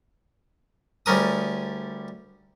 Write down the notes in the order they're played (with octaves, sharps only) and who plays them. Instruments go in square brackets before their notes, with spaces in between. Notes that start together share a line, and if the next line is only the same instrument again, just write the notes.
[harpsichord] D2 G3 C#4 A#4 D#6